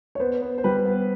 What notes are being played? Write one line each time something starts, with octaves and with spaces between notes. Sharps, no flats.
C#5
B3 C5
B3
C5
G3 B4
B3